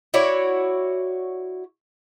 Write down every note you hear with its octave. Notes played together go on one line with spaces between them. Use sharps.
E4 F#4 C#5 D5